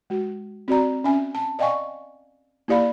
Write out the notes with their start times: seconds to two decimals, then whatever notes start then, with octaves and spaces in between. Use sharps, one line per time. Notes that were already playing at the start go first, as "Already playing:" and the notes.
0.10 G#3 F#4
0.68 C4 F#4 D5 A#5
1.04 C#4 E5 G#5
1.35 A5
1.59 D5 D#5 F5 G5 G#5 C#6
2.68 A#3 E4 G4 D5 F5 B5